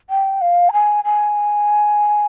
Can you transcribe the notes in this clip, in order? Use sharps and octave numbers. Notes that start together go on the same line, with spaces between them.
G5
F5
A#5
G#5
G#5